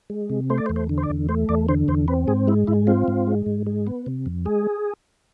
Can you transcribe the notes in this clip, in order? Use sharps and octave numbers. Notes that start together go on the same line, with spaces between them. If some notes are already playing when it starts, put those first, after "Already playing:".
G#3
C3
A3 C5
D5
C5
E2
C5
D3
C5
D5
E2
A3 C5
E2 D5
D3 C5
E2 C5
C4 B4
G#2 G#4
G#3 E4
G#2 E4
C4 F4
G#2
G#3
G#2
G#3
B3
C3
F2
G#3 G#4